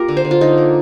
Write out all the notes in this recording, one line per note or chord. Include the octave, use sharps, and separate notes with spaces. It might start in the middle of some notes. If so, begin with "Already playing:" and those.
Already playing: A#3 F4 G4 A#4
D3
C5
D3
F4
D3 D#4
A#3